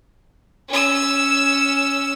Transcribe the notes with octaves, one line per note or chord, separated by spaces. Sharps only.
C#4 E6